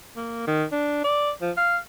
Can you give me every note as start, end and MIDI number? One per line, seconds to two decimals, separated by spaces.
0.16 0.45 58
0.47 0.64 51
0.72 1.03 62
1.04 1.31 74
1.41 1.51 53
1.57 1.77 77